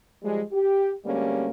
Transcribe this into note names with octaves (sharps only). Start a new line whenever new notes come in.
F3 G3 G#3
G4
D2 G3 G#3 A#3 C#4